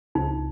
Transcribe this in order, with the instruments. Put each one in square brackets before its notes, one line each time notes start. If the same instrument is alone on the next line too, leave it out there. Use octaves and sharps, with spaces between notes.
[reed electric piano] C#2 [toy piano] D#4